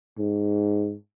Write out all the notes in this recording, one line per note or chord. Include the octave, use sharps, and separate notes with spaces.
G#2